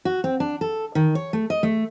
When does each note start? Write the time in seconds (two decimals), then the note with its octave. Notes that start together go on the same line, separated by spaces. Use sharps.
0.05 F#4
0.24 C4
0.40 D4
0.61 A4
0.95 D#3
1.15 C#5
1.33 A3
1.50 D#5
1.63 A3